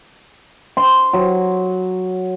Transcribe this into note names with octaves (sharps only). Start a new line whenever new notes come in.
C6
F#3